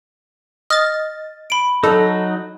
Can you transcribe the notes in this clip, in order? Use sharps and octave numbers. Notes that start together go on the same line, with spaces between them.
D#5 F6 A6
B5 D7
F#3 D#4 A4